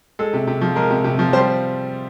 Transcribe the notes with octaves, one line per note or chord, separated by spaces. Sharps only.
G#3 A4
C3
C3
F3
G#3 A#4
C3
C3
F3
G3 C5